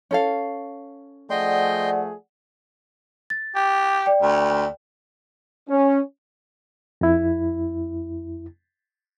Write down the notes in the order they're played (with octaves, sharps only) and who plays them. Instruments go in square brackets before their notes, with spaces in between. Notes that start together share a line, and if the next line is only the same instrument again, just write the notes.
[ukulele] C#4 A4 F5
[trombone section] F3 A3 G#4 [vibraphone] D5 F#5 [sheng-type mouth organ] D#5 G5 C6
[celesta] A6
[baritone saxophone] G4
[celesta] D5 G5
[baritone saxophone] D2
[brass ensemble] C#4
[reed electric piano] F2 E4